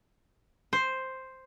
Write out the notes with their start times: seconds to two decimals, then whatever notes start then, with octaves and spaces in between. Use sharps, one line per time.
0.73 C5